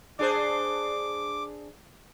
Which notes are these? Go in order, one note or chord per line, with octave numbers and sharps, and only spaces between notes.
D4 G#4 C5 D6